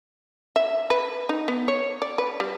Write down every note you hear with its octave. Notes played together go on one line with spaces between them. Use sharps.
E5
B4
D#4
B3
C#5
D5
B4
G3